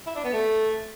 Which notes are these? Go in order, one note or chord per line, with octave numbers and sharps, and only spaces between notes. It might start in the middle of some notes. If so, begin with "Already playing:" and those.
E4
D4
B3
A3